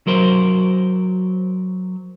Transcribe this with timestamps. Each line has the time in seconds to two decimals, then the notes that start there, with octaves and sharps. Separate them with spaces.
0.07 F#3 A#4 C5